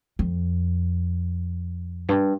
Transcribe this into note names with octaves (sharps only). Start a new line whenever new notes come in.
F2
G2